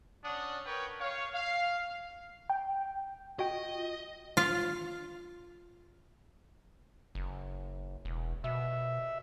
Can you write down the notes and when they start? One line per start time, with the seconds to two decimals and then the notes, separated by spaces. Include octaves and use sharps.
0.24 C#4 D4 F#5 D#6
0.66 A#4 B4 C#5 G5
1.00 C#5 F5
1.34 F5
2.50 G5
3.39 F4 F#4 D#5 G5
4.37 F4 F5
7.15 F#1
8.05 E1
8.44 B2 E5